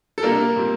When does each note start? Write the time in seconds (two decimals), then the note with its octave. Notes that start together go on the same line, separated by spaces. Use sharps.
0.18 A4
0.23 C3 G3 A#3 D4 A#4
0.56 A#2 G3 C4